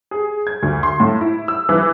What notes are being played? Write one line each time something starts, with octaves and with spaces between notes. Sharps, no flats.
G#4
G#6
D2
C6
A2
E4
E6
E3